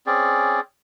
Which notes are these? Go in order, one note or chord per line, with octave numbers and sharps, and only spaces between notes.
C4 C#4 G#4 D5